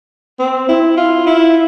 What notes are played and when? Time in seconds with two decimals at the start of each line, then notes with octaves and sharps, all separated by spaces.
0.39 C4
0.68 E4
0.97 F4
1.27 E4